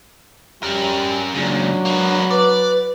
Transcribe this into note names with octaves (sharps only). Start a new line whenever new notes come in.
G3 C#4 A#4
A#2 C#3 F#3 D4
A#3 B4
B4 D5